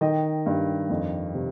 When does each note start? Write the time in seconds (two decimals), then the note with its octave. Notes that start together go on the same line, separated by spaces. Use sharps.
0.01 D#3 D#5 G5
0.46 G2
0.90 F2
1.34 C3